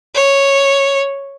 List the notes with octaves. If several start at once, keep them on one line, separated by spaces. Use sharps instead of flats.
C#5